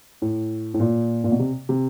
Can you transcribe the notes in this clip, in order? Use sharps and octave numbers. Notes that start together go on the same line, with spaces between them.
A2
A2
A#2
A#2
B2
C3
C3